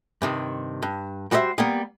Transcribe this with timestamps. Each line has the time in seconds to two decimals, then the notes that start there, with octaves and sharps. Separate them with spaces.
0.22 G2 C3 D#3
0.82 G2
1.31 G3 F#4 C5 C#5 E5
1.58 G3 A#3 B3